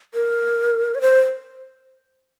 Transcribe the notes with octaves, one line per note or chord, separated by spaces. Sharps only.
A#4
C#5
C5